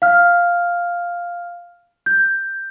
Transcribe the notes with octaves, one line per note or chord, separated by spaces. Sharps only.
F5 F6
G6